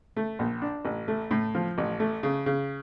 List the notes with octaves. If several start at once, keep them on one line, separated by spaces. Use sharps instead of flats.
A3
A#1
D4
A1
A3
A2
F3
A1
A3
C#3
C#3